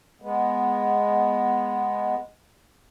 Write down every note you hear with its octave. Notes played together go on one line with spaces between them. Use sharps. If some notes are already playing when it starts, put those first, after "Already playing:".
G#3 B3